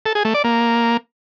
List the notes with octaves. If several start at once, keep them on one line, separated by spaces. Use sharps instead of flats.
A4
G#4
A3
D5
A#3